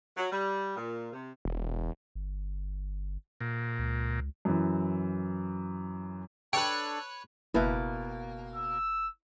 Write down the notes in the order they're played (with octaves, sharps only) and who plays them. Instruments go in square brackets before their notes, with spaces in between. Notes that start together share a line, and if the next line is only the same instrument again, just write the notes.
[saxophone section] F#3
G3
A#2
C3
[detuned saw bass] E1
[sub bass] G1
[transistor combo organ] A#2
[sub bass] C#2
[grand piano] F#2 E3
[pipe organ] D4 A4 [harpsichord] B4 C#5 [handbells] G5
[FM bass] F#1 [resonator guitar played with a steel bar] B2 A#3 [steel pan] E4 B4 E5
[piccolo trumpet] E6